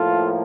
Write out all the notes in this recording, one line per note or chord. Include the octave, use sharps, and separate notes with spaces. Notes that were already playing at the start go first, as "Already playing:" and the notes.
Already playing: A2 F3 A#3 F4 A4